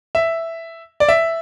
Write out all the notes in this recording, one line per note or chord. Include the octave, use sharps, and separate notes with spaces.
E5
D5
E5